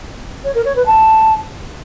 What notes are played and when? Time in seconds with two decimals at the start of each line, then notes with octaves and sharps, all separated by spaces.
0.44 C#5
0.55 A#4
0.65 C#5
0.76 B4
0.86 A5